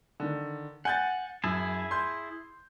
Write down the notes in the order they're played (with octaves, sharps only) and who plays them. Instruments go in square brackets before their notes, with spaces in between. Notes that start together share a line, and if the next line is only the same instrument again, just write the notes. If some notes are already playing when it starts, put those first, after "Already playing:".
[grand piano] D3 D#3
[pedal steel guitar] F#5 [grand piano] G#5 G6 A6
[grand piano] F#2 [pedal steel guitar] E4 G#4 A5
[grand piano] C6 G6